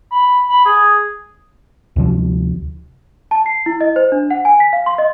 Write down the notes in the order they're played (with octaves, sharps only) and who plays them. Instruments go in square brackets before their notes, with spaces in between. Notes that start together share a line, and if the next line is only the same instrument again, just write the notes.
[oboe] B5
B5
G#4
[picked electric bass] D2 C3 F3
[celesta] A5
C7
E4
D#5
C5
D4
F#5
G#5
B6
F5
C6
D#5